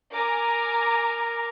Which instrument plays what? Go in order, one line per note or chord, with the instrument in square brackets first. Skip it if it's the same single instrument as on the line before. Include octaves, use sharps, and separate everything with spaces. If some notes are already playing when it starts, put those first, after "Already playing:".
[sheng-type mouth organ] A#4 [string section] G#5 A#5 D6